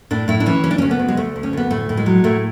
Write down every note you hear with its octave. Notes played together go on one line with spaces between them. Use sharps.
A2 D4
A2 E4
D4
E3 C#4
D2 C#4
D4
D2 C#4
B3
D2
G#3
D2 A3
D2
C#4
D2 B3
A2 A3
A2
G#3
F#3
A2 A3